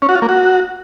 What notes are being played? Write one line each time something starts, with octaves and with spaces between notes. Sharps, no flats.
C#4
F#4
F4
A#3
F#4